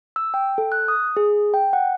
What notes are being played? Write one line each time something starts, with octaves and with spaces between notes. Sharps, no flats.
E6
G5
A4
F#6
D#6
G#4
G5
F#5